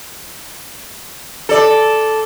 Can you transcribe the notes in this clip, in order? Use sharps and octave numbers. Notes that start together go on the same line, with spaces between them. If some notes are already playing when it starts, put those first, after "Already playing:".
A4 D5